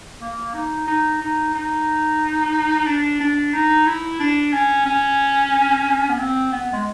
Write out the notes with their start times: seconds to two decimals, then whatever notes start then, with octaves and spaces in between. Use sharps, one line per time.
0.21 A#3
0.54 D#4
0.87 D#4
1.21 D#4
1.54 D#4
2.87 D4
3.20 D4
3.54 D#4
3.86 E4
4.19 D4
4.53 C#4
4.86 C#4
6.09 B3
6.19 C4
6.52 B3
6.73 G#3